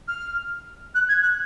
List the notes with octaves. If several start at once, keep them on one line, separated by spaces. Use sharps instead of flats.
F6
F#6
G#6
F#6